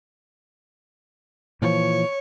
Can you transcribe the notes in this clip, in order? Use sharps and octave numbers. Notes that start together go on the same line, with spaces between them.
A#2 E3 F3 C#5